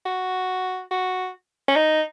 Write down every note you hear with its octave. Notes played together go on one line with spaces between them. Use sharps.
F#4
F#4
C#4
D#4